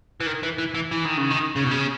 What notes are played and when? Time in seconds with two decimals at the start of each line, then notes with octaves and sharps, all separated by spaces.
0.21 E3
0.27 D#3
0.43 E3
0.58 E3
0.74 E3
0.91 E3
1.05 D#3
1.17 C#3
1.30 D#3
1.56 C#3
1.64 B2
1.71 C#3